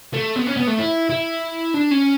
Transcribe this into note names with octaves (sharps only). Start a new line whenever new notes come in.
A3
B3
C#4
B3
A3
E4
E4
D4
C#4